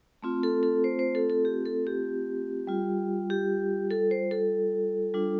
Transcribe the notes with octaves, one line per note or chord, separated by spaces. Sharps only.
A3 C4 F4
A4
A4
C5
C5
A4
A4
G4
A4
G4
G3 F4
G4
A4
C5
A4
G3 D4 F4